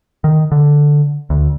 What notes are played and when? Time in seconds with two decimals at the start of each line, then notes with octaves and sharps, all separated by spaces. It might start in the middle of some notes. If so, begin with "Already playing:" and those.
0.24 D#3
0.52 D3
1.30 D2